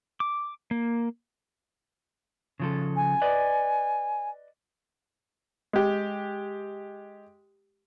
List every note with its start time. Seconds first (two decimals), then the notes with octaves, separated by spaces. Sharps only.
0.20 D6
0.71 A#3
2.60 C#3 F3 A4
2.96 G#5
3.22 B4 D5 D#5
5.73 G#3 G4